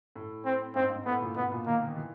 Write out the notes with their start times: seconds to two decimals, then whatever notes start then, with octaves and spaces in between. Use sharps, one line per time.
0.16 A2
0.45 C4
0.75 G#2 C4
0.90 G#2
1.06 A2 B3
1.21 A#2
1.36 B2 B3
1.52 A#2
1.66 D#3 A#3
1.82 D#3
1.96 E3